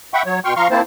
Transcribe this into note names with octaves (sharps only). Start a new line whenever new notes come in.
E5 F#5 G5 B5 C#6
F#3 C#5
B2 G5 C6 C#6 F6
F3 F5 A#5 C6 C#6 F6
A#3 C4 E4 C5 A5